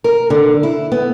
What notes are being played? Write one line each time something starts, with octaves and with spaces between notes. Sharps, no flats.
A#4
D3
E4
B3